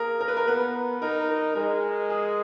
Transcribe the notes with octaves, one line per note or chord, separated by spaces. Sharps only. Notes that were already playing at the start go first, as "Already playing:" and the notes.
Already playing: A#3 G#4 A#4
A#4
B4
A#4
B3 B4
D#4 A#4
A#4
G#3 A#4
G#4